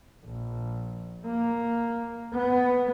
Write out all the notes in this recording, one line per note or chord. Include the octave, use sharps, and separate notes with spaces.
A#1
A#3
B3